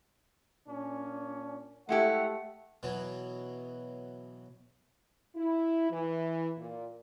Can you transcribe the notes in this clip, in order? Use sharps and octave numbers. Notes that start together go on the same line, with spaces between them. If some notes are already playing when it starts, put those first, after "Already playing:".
A#2 C#4 D4
G#3 A3 E4 G4 F#5
B2 E3 F#3 B3
E4
E3
A#2